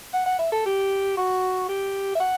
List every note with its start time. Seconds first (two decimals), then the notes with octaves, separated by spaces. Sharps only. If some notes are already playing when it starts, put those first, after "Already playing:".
0.13 F#5
0.26 F#5
0.39 E5
0.52 A4
0.65 G4
1.17 F#4
1.69 G4
2.15 E5
2.20 F#5